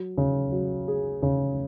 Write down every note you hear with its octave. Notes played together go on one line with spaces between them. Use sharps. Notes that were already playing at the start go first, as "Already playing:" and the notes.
Already playing: F#3
C#3
F#3
G#4
C#3